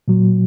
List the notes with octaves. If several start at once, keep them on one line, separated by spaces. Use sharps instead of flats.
A#2 F#3